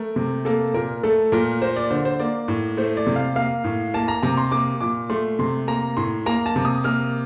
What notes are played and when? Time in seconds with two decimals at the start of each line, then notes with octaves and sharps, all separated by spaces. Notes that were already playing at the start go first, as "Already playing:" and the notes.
Already playing: A3 A#4
0.16 C3
0.45 A#3 A4
0.74 A#2 A#4
1.03 A3 A4
1.32 A#2 A#4
1.62 A#3 C5
1.76 D5
1.91 D3 C5
2.05 C5
2.20 A#3 D5
2.48 A2
2.77 A3 C5
2.97 D5
3.07 C3
3.16 F5
3.36 A#3 F5
3.64 A2
3.94 A#3 A5
4.08 A#5
4.23 C3 A#5
4.37 C6
4.52 A#3 D6
4.81 A#2 D6
5.10 A3 C6
5.39 C3 C6
5.68 A#3 A#5
5.97 A2 C6
6.26 A#3 A#5
6.46 A5
6.56 C3
6.65 D#6
6.84 A#3 F6